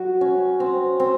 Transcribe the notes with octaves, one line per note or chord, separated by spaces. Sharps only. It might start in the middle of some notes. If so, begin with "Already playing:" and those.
Already playing: F#3 F#4
C#4
C4
C4